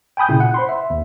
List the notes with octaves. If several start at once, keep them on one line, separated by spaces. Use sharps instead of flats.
G5 G#5 B5 D#6 G6
A#2 C#3 E4
F#5
C5 B5 C6
E5
D#2